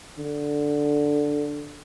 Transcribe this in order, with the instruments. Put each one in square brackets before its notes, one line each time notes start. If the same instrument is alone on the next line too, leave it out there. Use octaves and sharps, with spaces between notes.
[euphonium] D3